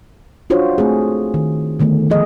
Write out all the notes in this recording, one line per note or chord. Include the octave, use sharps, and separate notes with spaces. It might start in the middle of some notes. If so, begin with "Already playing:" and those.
D4 F4 F#4 C5 C#5
A3 C4 G#4
D#3
D3 D#3 A3 B3
F3 G#4 D#5